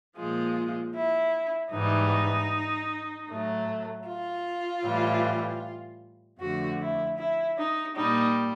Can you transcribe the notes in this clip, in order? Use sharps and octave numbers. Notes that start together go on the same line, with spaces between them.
A#2 F3 G#3 F4
E4
G#2 E3 G3 D#4
A2 F#3 A3
F4
A2 E3 G3
F2 D3 F3 A3 F#4
E4
E4
D#4
A#2 G3 D#4